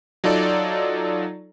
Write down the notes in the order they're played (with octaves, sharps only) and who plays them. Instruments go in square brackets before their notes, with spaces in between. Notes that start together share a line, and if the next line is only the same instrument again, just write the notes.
[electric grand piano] F#3 D#4 F4 A4 D5